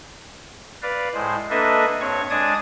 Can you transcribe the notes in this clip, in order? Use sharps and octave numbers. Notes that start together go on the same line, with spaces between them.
B4 D5 F5
A2 G#3 C5
A#3 D4 A4 B4 D#5 E5
G2 C4 C#5 C#6
G#3 D4 D5 A5 D#6 G#6